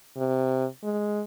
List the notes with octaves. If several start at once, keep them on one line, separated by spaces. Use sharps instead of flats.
C3
G#3